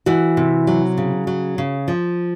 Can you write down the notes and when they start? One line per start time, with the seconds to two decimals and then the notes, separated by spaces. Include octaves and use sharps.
0.06 E3 F#4
0.37 C3
0.67 F#3
0.98 C#3
1.27 F#3
1.58 C#3
1.88 F3